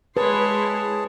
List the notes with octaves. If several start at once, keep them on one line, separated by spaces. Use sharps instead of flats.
G#3 E4 G#4 B4 C#5 A5 C6